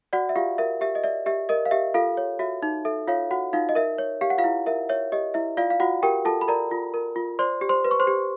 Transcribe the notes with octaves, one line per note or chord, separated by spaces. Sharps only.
F#4 D5 F#5
E5
F4 G4 F5
A#4 E5
G4 E5
D#5
D5 E5
G4 E5
A#4 D#5
F5
G4 E5
F4 A4 F5
C#5
F#4 E5
D#4
A4 E5
F4 C#5 F5
F#4 F#5
D#4 F4 F5
D#5
A#4 E5
C#5
G4 F5
F#5
F4 F5
E4
A#4 E5
C#5 E5
G4 D#5
E4 E5
F4 D5 F5
F5
F4 F#4 F#5
G4 A#4 G5
F4 A4 A5
B5
A#4 D5 A#5
F4
A#4
F4
C5 D5 C6
G4
C5 C6
B4
C#6
C5 C6
G4